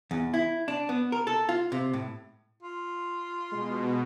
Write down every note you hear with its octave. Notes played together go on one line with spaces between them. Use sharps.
E2
E4
D4
B3
A#4
A4
F4
C3
A2
F4
B2 G#3